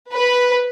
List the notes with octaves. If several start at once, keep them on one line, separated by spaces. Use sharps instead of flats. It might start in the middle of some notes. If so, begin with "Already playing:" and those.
B4